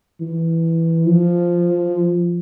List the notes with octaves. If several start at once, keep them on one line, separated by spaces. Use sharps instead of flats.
E3
F3